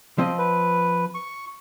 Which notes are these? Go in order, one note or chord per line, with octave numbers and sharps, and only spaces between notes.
F3 C4 D#5
B4
C#6